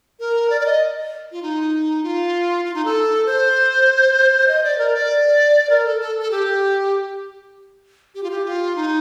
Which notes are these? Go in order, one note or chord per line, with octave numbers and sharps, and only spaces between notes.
A#4
D5
D5
D#5
F4
D#4
F4
F4
D#4
A4
C5
D#5
D5
A#4
D5
A#4
A4
A4
A4
G4
G4
F4
G4
F4
D#4